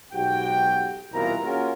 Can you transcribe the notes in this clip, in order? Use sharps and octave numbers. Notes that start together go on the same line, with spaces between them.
B1 G#2 B2 F#4 G4 G5
C2 B2 E3 F4 A#4 A#5
A#3 C#4 F4 F#4 G#4 A#4